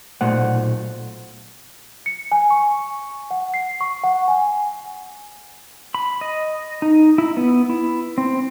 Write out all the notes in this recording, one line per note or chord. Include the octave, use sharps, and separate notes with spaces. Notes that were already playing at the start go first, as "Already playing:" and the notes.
B1 A#2 A3 C5 F#5
C#7
G#5
C#6
F#5
C7
C#6
F#5
G#5
B5
D#5
D#4
E4
B3
E4
C4